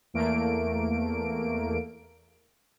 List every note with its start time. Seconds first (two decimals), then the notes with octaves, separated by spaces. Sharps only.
0.14 E2 A3 A#3 D7